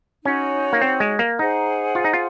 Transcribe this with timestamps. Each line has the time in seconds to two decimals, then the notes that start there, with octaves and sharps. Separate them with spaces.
0.25 C#4 D#4 F#4 C#5
0.73 A#3
0.82 C4
1.00 G#3
1.19 A#3
1.39 D#4 G#4 C5 F#5
1.95 F4
2.04 D#4
2.13 F4